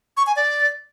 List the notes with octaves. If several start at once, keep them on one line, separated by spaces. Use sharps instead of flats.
C#6
G#5
D5